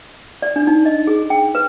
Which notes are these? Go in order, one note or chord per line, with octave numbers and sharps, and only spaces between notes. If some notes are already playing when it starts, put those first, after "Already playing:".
D5
D4
D#4
D#5
G#4
G5
B4